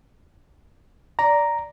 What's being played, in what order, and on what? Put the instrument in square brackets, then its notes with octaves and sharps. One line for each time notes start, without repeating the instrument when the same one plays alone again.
[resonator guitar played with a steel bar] D5 [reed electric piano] A#5